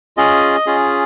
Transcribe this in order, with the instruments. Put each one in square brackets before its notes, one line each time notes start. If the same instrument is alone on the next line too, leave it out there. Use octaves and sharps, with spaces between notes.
[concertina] C#4 F4 G#4 D#5
C#4 F4 G#4